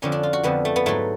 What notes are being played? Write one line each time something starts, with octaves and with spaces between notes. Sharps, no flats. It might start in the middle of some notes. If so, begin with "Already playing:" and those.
F2 D3 F3 C#4
D4
F4
F#4
F2 D3 F3 B3
A3
B3
G#2 F#3 A3